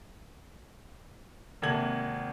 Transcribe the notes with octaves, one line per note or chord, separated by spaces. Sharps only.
G#1 C3 A#3 A4 G#6 F#7